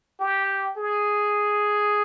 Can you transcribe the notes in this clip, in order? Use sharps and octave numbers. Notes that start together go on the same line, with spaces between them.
G4
G#4